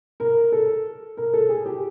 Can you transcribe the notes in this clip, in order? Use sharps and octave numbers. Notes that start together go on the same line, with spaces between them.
A#4
A4
A#4
A4
G#4
G4